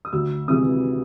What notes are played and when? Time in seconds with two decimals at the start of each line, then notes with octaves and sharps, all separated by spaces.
0.05 D#6
0.13 D2 E6
0.48 C3 E3 G#3 D#6